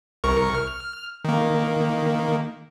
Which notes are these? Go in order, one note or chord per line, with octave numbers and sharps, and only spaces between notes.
C2 A#4 C#6
F6
D#3 A#3